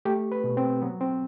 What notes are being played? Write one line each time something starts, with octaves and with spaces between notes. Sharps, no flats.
A3 G4
B4
B2
C4
F#3 B3
C4